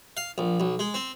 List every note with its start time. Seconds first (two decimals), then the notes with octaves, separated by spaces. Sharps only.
0.17 F5
0.38 A#1
0.60 B1
0.79 G#3
0.94 C4